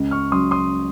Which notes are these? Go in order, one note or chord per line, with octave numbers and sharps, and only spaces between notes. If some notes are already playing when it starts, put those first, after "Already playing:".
Already playing: C#2
C#6 F6
C#3 F#3 C6 D#6
C6 D#6